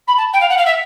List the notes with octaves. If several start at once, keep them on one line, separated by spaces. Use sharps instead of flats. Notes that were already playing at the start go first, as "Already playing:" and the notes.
B5
A5
G5
F5
F#5
F5
E5